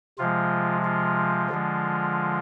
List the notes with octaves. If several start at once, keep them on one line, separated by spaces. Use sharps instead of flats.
C3 F3 G#3 F4
F4
D3 F3 G#3